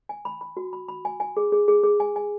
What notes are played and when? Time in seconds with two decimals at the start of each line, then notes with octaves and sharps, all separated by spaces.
0.09 G#5
0.25 B5
0.41 B5
0.57 F#4
0.73 B5
0.88 B5
1.05 G#5
1.20 G#5
1.37 G#4
1.52 G#4
1.68 G#4
1.83 G#4
2.00 G#5
2.16 G#5